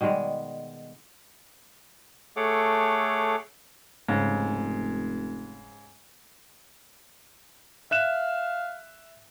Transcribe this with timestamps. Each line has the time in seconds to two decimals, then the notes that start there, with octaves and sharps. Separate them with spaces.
0.01 B2 D#3 G3 G#3
2.36 A3 G#4 A4 C#5 F#5 D6
4.09 F1 G#2 C#3
7.91 E5 F5 F#6 E7